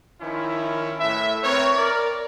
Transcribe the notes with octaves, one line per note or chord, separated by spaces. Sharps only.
D#3 F3 C#4 E4
A2 B4 E5
C4 A#4 B4 C#5
A#4 D5